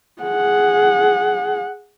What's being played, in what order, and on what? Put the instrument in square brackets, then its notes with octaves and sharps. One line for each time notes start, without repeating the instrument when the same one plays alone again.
[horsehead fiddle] G#4 F#5